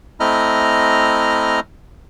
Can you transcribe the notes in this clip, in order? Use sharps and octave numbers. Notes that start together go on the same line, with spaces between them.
A3 C4 E4 D#5 A#5 F6